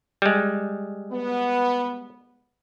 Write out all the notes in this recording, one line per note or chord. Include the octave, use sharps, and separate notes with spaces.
G3 G#3
B3